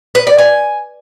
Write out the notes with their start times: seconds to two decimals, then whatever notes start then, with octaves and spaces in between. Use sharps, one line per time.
0.15 B4
0.27 D5
0.38 G#5